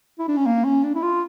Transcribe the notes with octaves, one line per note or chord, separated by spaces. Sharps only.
E4
D4
C#4
A#3
C#4
D4
E4
F4